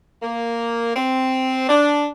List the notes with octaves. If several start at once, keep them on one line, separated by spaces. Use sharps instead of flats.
A#3
C4
D4